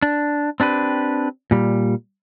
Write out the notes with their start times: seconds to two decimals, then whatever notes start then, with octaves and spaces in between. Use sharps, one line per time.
0.02 D4
0.60 C4 D4 G4 B4
1.51 A#2 G3